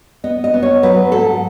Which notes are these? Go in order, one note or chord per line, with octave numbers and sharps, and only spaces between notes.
B3 D#5
D#5
B3
C#5
F#3 B4
G#2 A4